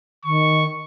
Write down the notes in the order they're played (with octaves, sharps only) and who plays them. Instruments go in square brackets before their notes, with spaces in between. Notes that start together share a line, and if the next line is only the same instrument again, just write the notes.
[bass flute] D#3 [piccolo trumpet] C#6